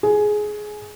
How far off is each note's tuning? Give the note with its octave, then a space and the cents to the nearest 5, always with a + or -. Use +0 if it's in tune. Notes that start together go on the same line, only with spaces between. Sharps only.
G#4 +15